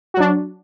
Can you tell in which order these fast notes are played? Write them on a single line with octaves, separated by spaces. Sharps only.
F#4 F#3 D4